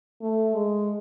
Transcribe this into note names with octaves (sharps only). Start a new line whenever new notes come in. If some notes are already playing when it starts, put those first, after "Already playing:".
A3
G#3